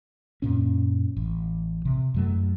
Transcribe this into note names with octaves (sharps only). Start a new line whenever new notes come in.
F#2 A#2 C#4
A1
C3
F#2 F#3 A3